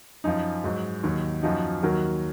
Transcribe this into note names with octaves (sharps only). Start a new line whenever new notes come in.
F#2 F3 D#4
G#2 F#3
D#2 D#3 F#3
F#2 F3 D#4 F#4
D#2 D#3 F#3 F#4 A#4